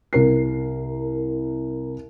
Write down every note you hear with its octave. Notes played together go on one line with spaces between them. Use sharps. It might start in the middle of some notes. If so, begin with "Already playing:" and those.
C2 A#4 C7